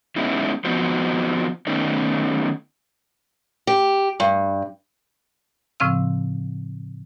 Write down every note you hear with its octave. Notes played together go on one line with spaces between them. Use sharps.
G#3 B3 C#4 D#4 E4
F3 B3 C4 D#4 F#4 C5
D#3 A3 B3 C#4 D#4
G4
G2
A2 C#3 F3 C4 F5 E6